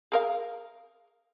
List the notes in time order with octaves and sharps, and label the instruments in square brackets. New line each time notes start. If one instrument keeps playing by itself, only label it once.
[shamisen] G#4 A#4 F5